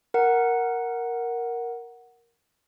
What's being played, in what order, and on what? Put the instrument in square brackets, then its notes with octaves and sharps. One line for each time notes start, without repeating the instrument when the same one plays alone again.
[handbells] A#4 F#5